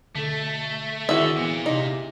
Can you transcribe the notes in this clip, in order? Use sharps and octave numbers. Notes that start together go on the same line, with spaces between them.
B2 D3 A3 A4
D3 D#3 C4 E4 F#4 G#4 E5
A#2 E3 B3
C3 D#4